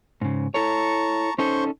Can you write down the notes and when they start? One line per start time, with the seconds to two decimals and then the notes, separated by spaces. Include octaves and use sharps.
0.21 G#2 C#3
0.54 E4 A4 C#5 A5 A#5 C#6
1.38 C#4 D#4 A4 C5 C6 C#6